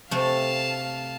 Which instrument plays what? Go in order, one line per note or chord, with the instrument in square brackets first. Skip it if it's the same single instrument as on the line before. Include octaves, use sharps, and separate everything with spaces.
[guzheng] C3 A3 [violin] F5 A5